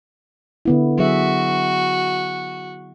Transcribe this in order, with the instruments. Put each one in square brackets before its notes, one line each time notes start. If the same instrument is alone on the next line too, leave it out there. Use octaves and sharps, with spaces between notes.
[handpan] D3 B3 E4
[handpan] F#3 G#4 E5 [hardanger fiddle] F#4